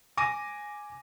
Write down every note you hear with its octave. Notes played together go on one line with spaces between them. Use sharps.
G#5 D6 A#6 D#7